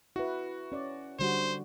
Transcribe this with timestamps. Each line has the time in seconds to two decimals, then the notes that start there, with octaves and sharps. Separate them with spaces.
0.16 E4 F#4 B4
0.72 C#4 D5
1.19 D3 G3 F#4 C5